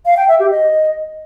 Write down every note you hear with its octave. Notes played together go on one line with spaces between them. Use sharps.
F5
G5
E5
G4
D#5